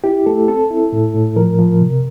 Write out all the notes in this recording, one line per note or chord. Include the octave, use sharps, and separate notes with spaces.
E4 G4
A3 A4
C4 A4
E4
A2
A2
F3 A#4
F3
C3